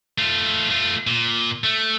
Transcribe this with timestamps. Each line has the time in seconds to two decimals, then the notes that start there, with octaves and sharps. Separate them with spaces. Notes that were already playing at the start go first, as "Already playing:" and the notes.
0.18 A3 F4
0.70 A3 F4
1.07 A#2
1.64 A3